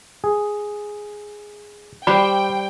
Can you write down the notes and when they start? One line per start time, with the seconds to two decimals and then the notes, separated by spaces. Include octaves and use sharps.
0.24 G#4
2.07 G3 C5 D5 G5 B5 C#6